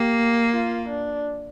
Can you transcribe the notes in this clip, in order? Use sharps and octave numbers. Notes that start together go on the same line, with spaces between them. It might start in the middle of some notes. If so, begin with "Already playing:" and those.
Already playing: A#3 G4
F4
D4